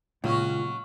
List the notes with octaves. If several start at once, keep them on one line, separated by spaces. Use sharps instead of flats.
C#2 A#2 F#3 C#4